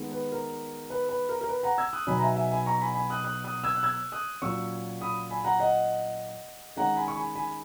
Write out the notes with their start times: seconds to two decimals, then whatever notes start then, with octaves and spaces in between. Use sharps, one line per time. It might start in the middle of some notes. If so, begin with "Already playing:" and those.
Already playing: D#3 G#3 B3
0.12 B4
0.32 A#4
0.90 B4
1.09 B4
1.29 A#4
1.41 A#4
1.48 B4
1.63 F#5 A#5
1.78 E6 G#6
1.93 D#6 F#6
2.07 B2 F#3 B3 D#4 G#5 B5
2.18 A#5
2.22 E5 G#5
2.36 E5 G#5
2.51 G#5 B5
2.66 A#5 C#6
2.81 G#5 B5
2.95 G#5 B5
3.10 D#6 F#6
3.24 D#6 F#6
3.44 D#6 F#6
3.64 E6 G#6
3.75 F#6
3.83 E6 G#6
4.12 D#6 F#6
4.42 A#2 F#3 C#4 C#6 E6
5.01 B5 D#6
5.30 G#5 B5
5.45 F#5 A#5
5.60 D#5 F#5
6.77 D#3 G#3 C#4 F#5 A#5
6.96 G#5 B5
7.08 C#6
7.16 G#5 B5
7.36 G#5 B5